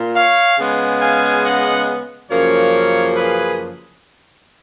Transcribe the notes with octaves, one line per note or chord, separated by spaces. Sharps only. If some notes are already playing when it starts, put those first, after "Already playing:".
Already playing: A#2
C#5 F5
C#3 G#3 B3
F5 G#5
D#5 F#5
F#2 C#3 F3 A#3 A#4 C#5
G#4 B4